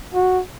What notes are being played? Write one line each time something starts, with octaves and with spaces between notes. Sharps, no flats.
F#4